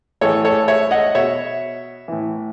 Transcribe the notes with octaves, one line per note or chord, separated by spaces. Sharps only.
A2 E3 A4 C#5
A4 C#5
C#5 E5
D#5 F#5
B2 C#5 E5
A2 E3